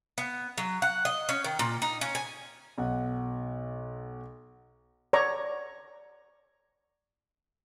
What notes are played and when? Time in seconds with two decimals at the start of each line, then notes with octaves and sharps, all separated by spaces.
0.18 B3
0.58 F#3
0.82 F#5
1.05 D#5
1.29 C#4
1.44 D#3
1.59 A#2
1.82 D#4
2.01 C#4
2.15 G#5
2.78 B1 F#5
5.13 C#5 D5 A#5 C#6